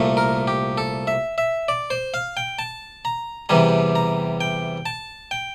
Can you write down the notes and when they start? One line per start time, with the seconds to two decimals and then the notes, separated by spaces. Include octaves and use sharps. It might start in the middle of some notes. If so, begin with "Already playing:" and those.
Already playing: C2 A#2 A3
0.17 A#4
0.48 G4
0.78 A4
1.07 E5
1.38 E5
1.68 D5
1.90 C5
2.14 F5
2.37 G5
2.59 A5
3.05 A#5
3.49 E2 C3 E3 G3 A#5
3.95 A#5
4.41 G5
4.86 A5
5.31 G5